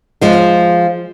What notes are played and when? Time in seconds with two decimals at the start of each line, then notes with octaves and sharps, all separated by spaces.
0.21 F3 G#3